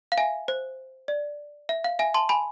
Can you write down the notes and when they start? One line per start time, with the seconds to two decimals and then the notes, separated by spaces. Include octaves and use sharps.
0.12 F5
0.18 E5 G#5
0.48 C5
1.08 D5
1.69 E5
1.84 F5
1.99 E5 G#5
2.14 A5 C6
2.29 G#5 B5